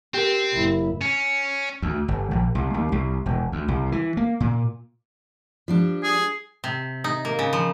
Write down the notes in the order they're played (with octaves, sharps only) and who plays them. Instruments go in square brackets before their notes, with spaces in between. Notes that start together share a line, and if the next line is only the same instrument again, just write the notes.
[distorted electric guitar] C4 [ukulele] G4 A#4
[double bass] F#1 E4
[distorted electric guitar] C#4
[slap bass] D2
G1
A#1
C2
D#2
C2
E1
D2
C2
E3
A#3
A#2
[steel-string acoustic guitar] F3 G3 D4
[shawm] G#4
[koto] C3
D#4
A#3
C#3
F3